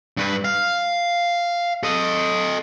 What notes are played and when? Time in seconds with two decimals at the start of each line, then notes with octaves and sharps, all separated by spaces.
0.17 G2 B4
0.44 F5
1.83 A4 D#5